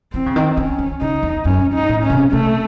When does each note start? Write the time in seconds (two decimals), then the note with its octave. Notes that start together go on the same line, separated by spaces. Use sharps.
0.13 E3 C4
0.26 C#3
0.36 D#3
0.57 D#3 C#4
0.79 D#3
1.01 C#3 D#4
1.23 E2
1.45 F#2 C#4
1.66 G#2
1.74 D#4
1.89 A2
2.03 C#4
2.10 C3
2.32 C3 A3